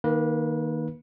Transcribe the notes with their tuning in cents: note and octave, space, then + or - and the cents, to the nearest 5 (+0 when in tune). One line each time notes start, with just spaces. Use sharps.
D#3 +0 A#3 +5 B4 -25